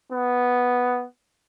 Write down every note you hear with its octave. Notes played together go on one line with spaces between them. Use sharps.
B3